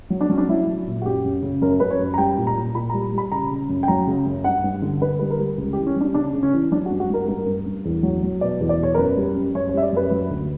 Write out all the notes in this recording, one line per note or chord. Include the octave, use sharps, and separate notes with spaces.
F#3
D4
F#3 C#4
D4
F#3 E4
F#3
A#2
F#4
F#2 G4
F#2
C#3
F#2 A#4
F#2 B4
C#5
F#2
A#5
G3 G5
A#2
A#5
A#2
A#2 B5
A#5
G3
G3 B5
C#3 A#5
C#3
F#2
G5
F#3 A#5
C#3
F#2
G2 F#5
G2
D3
D3 B4
G3 B4
A#4
G3
C#2
G4
E3
C#4
G3 D4
C#3 D4
C#3
C#4
E3
F#3 D4
F#4
G2
F#4
G2 A#4
G2 A#4
G2
G2
E2
F#3
F#3
B2 D5
E2
D5
B2 C#5
A#4
F#2 B4
G3
F#2
F#2 C#5
C#5
G3 E5
D5
F#2 B4
F#3
D2